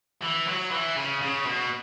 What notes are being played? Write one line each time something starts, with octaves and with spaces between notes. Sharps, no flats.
E3
F#3
E3
C#3
C#3
B2